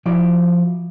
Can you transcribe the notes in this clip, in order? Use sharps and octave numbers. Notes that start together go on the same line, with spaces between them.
F3 E4 F#4 D5